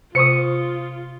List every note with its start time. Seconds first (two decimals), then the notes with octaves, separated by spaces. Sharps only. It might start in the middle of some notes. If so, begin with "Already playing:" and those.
0.15 C3 F4 C5 C#6 D#6 C#7